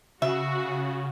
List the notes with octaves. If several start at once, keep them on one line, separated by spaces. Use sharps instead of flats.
C#3 F#4 E5